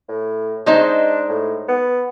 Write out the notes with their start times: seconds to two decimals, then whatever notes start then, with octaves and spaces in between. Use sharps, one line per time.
0.09 A2
0.66 G#3 D4 D#4 C5
1.28 A2
1.68 B3